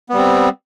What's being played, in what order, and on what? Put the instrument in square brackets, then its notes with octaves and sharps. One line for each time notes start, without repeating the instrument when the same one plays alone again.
[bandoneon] B3
G3
C4